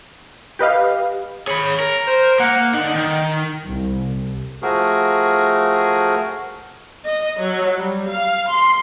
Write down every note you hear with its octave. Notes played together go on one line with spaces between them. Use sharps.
G4 B4 D#5 F5
G#4 C#5 B5
A#4
C5
A#3 F#5
D3 D#4 F#5
D#3
C2
F3 A3 F#4 G#4 A#4
D#5
F#3
G3
F5
C6